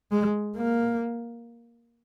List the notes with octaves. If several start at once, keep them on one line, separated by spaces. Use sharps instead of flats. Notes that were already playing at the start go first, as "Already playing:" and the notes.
G#3
A#3